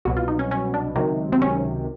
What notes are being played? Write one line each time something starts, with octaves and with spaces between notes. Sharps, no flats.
C2 B2 F#3 F#4
F4
D#4
C#4
C#4
D4
C#2 C3 D#3 F#3 D#4
C4
C#4